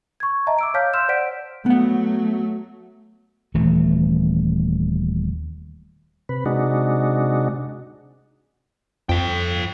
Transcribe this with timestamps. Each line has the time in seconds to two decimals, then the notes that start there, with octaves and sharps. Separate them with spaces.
0.20 C#6 G#6
0.47 D#5 E5 A5 A#5
0.59 D6 E6 D7
0.74 C#5 F5 A5 F6 G6 B6
0.94 C6 E6 F6 G6 E7
1.09 C5 D5 F#5 B6 D7
1.66 F#3 A3 B3 F#5
3.54 D#1 E3 A3
6.29 C3 B4
6.46 C3 G#3 D4 D#4 F#4
9.09 F2 A4 G5